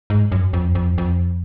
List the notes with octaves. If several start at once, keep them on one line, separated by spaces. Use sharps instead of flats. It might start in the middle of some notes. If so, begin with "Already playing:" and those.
G#2
F#2
F2
F2
F2